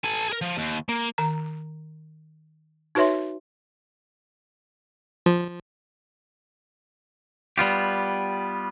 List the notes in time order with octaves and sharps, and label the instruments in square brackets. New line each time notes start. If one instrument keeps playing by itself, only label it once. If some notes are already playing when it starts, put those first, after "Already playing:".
[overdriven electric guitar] A4 G#5
G#4 A#4
F3
D#2
A#3
[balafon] D#3 A#5
D#4 F#4 B4 C#5 E5 C6
[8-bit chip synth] F3
[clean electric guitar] G3 B3 F4 G4